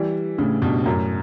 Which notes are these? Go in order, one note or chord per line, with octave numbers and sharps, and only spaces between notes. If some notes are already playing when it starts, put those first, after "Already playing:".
Already playing: E3 G3
A2 C#3
G2 B2
F#2 A2